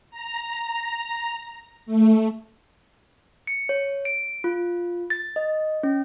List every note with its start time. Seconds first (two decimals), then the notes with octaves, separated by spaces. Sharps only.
0.11 A#5
1.86 A3
3.47 C#7
3.69 C#5
4.05 D7
4.44 F4
5.10 A6
5.36 D#5
5.83 C#4